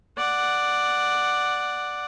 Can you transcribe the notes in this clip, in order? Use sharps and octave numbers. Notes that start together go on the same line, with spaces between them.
D5 F#5